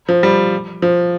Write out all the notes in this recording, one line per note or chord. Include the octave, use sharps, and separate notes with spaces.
F3
G3
F3